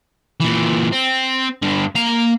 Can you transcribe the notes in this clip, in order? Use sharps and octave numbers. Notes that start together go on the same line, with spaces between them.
A#2 E3
C4
G2 D3
A#3 A#5